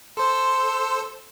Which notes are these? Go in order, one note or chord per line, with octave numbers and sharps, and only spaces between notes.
A4 C5 C6 E6